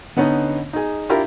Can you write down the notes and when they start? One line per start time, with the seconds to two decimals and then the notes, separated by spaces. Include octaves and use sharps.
0.17 D3 B3 C#4 D#4
0.73 D#4 G#4
1.09 D4 E4 F4 G4 A#4